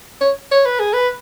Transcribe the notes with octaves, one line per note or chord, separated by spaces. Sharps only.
C#5
C#5
B4
G#4
B4